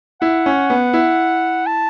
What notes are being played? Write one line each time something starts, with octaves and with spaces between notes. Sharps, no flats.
E4 F#5
C#4
B3
E4
A5